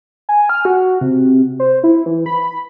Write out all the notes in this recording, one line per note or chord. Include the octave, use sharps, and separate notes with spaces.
G#5
F6
F#4
C3
C5
E4
E3
B5